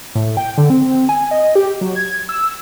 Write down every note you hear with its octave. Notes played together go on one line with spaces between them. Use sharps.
A2
G5
D3
C4
G#5
D#5
G4
F#3
G#6
E6